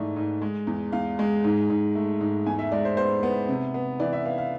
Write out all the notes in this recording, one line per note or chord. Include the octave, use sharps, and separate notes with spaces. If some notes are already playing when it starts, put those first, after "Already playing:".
Already playing: G#2 E3 A3 D5
G#2
G#3
E2
E2 F5
G#3
G#2
G#2
A3
G#2
E2 G#5
E5
G#3 D5
C5
B3 C5
B3
C3
B3
E3 D5
E5
B3 F5
F5